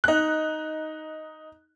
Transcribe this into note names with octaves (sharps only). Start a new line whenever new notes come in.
D#4 F#6